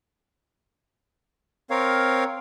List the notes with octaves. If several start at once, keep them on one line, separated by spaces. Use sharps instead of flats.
C4 A#4 C#5 F5